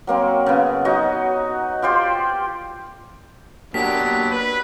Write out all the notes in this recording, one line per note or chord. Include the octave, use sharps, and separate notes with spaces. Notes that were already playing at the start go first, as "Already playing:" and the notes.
F#3 A#3 C4
C#3 B3
F#3 D#4 F#4 D#5
F4 G4 C5 D5
F#3 A#3 B3 D4 G4 B6
B4